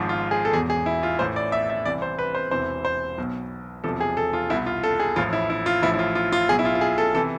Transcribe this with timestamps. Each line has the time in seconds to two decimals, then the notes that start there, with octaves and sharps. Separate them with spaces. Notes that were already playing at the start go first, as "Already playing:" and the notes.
Already playing: G#1 G#2 F3
0.09 F4
0.31 G#4
0.45 A4
0.53 E1 E2 B2 G#4
0.70 G#4
0.86 E4
1.03 F4
1.19 A1 A2 E3 C5
1.36 D5
1.52 E5
1.70 E5
1.85 C2 C3 E3 D5
2.02 C5
2.19 B4
2.35 C5
2.51 E1 E2 C3 E3 C5
2.85 C5
3.18 B1 B2
3.84 E1 E2 C3 F3 A4
4.00 G#4
4.17 A4
4.33 F4
4.50 C2 B2 E4
4.66 F4
4.84 A4
5.00 G#4
5.16 A1 A2 F3 F4
5.33 E4
5.50 E4
5.66 F4
5.82 A1 A2 F3 E4
5.94 E4
5.99 F4
6.15 F4
6.32 F4
6.48 B2 G#4
6.52 B1
6.59 E4
6.65 F4
6.75 F4
6.81 G#4
6.98 A4
7.15 C3 E3 A4